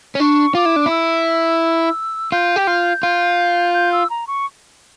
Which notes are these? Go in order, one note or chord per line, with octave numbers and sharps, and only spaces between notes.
C#4
D4 C#6
F4 D6
E4
D4
E4 E6
F4 G6
G4
F4
F4
G6
E6
A#5
C#6